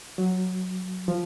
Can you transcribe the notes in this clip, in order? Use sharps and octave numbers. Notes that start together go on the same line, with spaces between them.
F#3
F3